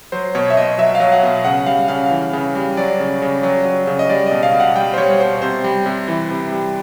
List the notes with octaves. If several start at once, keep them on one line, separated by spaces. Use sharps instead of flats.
F#3 C5
B2 C#5
E5
B2 D#5
F#3 E5
F5
F#3
F#5
B2
C#3 F#5
G3 F5
C#3 F5
E3
C#3
G3
F#3 D5
C#3
C#3
F#3
F#3
C#3
D#5
G3 D5
B2 D#5
F5
B2
F#5
G3 G5
C5
G3 C#5
B2 C5
C3 C5
G3
C3
E3
C3
G3